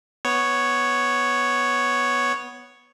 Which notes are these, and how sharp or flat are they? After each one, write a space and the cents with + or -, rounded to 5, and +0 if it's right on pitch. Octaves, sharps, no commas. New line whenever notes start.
B3 +0 C#5 +0